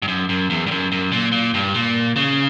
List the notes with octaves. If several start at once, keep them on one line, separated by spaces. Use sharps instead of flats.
G2
F#2
F#2
E2
G2
F#2
F#2
A#2
A#2
G2
A#2
C#3